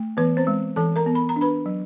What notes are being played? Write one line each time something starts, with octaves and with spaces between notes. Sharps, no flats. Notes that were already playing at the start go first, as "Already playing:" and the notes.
Already playing: A3
E3 B3 B4
C4 C5
G#3
E3 A4 A5
A#4 A#5
B3
B5
A#5
D4
B4 B5
F#3